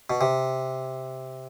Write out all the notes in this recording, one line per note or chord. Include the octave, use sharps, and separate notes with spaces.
B2
C3